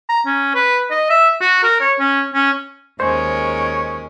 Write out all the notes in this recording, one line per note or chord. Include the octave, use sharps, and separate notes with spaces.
A#5
C#4
B4
D#5
E5
F#4
A#4
C#5
C#4
C#4
D#2 G#3 C#4 A#4 C5 C#5